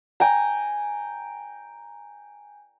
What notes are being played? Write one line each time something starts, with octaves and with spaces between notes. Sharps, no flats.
G5 G#5 A#5